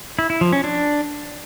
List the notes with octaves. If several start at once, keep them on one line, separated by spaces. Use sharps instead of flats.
E4
E4
F3
C#4
D4